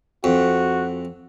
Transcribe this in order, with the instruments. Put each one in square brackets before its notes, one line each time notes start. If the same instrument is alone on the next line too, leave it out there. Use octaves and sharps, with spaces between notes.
[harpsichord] F2 [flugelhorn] F#4